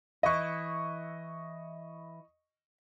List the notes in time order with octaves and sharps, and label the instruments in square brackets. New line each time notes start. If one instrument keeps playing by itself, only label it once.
[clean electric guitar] E3 E4 [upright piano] D#5 C#6